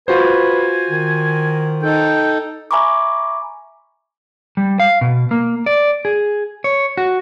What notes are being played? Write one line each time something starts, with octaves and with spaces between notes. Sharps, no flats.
F4 F#4 B4 C5 G#5
D#3
D#4 A4 G5
E5 G#5 A#5 B5 C#6 D6
G3
F5
B2
A#3
D5
G#4
C#5
F#4